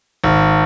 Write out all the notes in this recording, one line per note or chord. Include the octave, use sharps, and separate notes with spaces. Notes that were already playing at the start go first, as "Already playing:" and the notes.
G#1